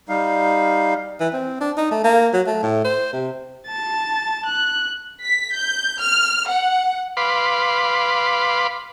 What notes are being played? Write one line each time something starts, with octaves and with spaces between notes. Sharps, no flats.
G3 D#4 F5
E3
C4
D4
D#4
A3
A#3
F#3
A3
A2
C5
C3
A5 A6
F#6
B6
G6
F6
F#5
B4 F5 B5 C6 D6